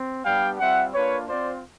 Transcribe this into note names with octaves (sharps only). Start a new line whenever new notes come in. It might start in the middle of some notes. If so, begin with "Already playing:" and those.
Already playing: C4
G3 B3 D4 G4 F5 G5
G3 C4 F4 E5 F#5
A#3 D4 F4 B4 C#5
C4 F4 C5 D5